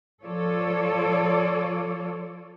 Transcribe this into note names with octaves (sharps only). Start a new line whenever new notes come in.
F3 F4 A4 C#5 D5